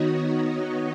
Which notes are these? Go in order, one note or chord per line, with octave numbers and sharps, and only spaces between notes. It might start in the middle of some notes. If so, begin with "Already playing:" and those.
Already playing: D#3 B3 D#4 F#4 C#5 D#5
D#5